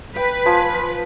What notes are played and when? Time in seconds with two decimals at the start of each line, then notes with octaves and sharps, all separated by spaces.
0.16 B4 G5
0.46 F3 G#5